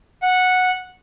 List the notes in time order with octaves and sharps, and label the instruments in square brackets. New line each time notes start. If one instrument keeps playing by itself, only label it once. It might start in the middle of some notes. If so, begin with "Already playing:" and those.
[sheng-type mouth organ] F#5